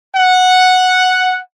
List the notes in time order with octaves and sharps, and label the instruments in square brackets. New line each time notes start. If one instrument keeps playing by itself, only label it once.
[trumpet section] F#5